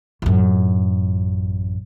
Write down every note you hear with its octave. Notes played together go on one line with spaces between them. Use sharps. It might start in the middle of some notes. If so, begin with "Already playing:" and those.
A1 F#2